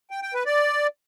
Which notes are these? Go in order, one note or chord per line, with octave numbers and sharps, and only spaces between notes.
G5
G5
B4
D5